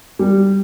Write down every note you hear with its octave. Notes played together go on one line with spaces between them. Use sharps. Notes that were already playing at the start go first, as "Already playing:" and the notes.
G3